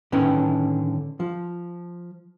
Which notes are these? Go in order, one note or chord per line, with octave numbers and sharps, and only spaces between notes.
A2 D3 D#3 C#4 E4 B4
F3